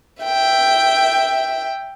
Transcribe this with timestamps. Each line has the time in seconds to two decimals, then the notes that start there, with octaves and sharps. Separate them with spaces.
0.23 E5 G5